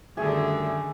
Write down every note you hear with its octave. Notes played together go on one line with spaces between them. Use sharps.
F#2 D3 D#3 G3 A3 G#4 E5